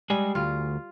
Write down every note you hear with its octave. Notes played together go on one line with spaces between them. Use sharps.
G3 G#3 G#5
D2 F4